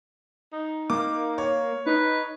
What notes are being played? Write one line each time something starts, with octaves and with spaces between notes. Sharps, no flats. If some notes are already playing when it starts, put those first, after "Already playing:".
D#4
A#3 D6
C#5
D#4 B4